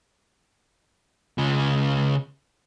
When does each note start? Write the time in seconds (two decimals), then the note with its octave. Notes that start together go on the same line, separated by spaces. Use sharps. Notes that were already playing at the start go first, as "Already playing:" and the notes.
1.38 C#3 F4